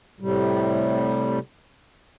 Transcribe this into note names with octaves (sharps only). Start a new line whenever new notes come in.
A2 C3 G3